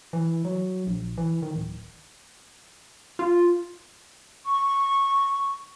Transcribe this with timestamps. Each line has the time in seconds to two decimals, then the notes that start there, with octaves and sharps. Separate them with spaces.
0.13 E3
0.45 F#3
0.87 A#1
1.18 E3
1.42 D#3
1.56 D1
3.19 F4
4.45 C#6